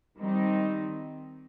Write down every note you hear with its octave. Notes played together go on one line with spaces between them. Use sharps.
D#3 G3 C4 D#4